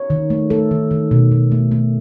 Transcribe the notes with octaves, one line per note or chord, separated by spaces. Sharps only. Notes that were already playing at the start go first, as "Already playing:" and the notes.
Already playing: C#5
D#3
A3
A3 A4
D#3
D#3
B2
B2
A3
A3